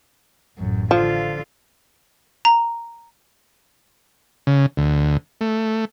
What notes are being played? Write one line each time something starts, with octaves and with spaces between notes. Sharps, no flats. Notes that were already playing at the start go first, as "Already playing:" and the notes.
A1 F#2
D3 F3 F4
A#5
C#3
D2
A3